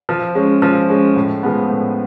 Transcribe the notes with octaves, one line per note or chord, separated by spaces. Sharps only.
F3
G#3 C#4
F3
G#3 C#4
A2
F3 G#3 B3
A2